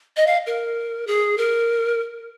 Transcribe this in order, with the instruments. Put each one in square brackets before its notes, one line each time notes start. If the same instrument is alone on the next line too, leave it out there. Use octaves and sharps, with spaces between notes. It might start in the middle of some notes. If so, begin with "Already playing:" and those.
[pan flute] D#5
F5
A#4
G#4
A#4